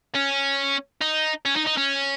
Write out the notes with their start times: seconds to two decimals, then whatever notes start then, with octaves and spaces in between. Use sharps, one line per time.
0.15 C#4
1.01 D#4
1.45 C#4
1.56 D#4
1.66 D#4
1.77 C#4